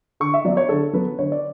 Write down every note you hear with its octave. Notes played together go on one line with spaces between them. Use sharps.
D3 C#6
E5
F#3 B3 D5
C#5
D3 A4
F#3 B3 B4
D3 C#5
D5